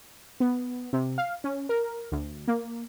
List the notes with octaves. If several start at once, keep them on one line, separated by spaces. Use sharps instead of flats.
B3
C3
F5
C#4
A#4
D2
A#3